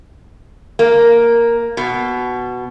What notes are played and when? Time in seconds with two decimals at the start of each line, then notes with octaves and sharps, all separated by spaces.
0.79 A#3
1.77 B2